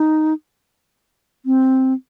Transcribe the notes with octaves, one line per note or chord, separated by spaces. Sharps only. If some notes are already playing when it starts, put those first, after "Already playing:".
Already playing: D#4
C4